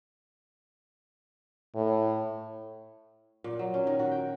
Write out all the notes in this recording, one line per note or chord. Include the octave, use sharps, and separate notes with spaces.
A2
A#2
F#3
C#4
D#3
F#4
G5